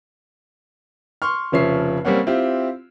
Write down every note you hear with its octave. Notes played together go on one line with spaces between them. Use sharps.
C6 C#6 F6
F1 C#3 F3 C#5 E5 C7
G3 A#3 C4 C#4 F#5
C4 E4 F4 G4